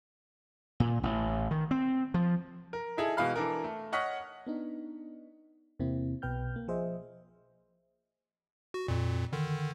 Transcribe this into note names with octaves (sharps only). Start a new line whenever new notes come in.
A#2
A1
D#3
C4
F3
A#4
D#4 E4 G#4 A4
B2 E3 G#3 F5 B5 F6
E3 D4 A4 A#4
A3
C#5 D#5 F#5 C#6 F6 B6
B3 D4 D#4
E2 C3 A#3 C4 E4
B1 B2 B4 G5 F6 G6
A#3
F3 G#4 C5 D#5 E5
F#4
F2 A#2
D3 D#3